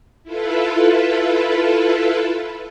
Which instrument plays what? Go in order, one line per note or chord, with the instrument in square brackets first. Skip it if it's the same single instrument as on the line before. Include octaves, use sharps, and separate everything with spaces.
[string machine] E4 F4 A4 B4